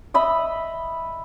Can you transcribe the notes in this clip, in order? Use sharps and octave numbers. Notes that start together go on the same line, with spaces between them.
D#5 E5 B5 D#6